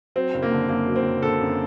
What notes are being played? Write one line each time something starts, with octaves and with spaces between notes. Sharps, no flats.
F#3 C4
F#1
A#3
D3
F#2 A#3
F#3
C4
F#1
D3 A4
F#2